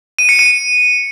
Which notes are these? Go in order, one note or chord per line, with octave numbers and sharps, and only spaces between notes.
D#7
C#7
D#7